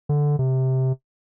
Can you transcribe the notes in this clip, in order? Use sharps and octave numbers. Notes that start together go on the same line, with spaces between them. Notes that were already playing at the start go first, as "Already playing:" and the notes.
D3
C3